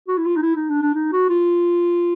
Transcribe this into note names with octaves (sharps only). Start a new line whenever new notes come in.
F#4
E4
F4
D#4
E4
D#4
D4
D4
D#4
F#4
F4